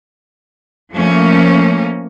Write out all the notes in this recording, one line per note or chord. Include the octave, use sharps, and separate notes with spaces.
F3 A3 A#3 C#4